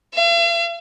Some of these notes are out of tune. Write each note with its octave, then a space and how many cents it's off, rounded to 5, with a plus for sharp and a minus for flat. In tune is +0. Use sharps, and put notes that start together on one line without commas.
F5 -45